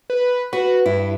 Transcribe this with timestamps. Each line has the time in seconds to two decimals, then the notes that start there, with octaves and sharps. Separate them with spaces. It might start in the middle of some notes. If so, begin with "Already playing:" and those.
0.10 B4
0.53 F#4 B4
0.86 G2 E4